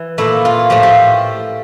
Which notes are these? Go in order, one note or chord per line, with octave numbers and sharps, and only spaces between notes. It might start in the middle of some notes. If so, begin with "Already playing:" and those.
Already playing: E3
A#2 A3 E4
F4
A2 F3 A3 G4
G4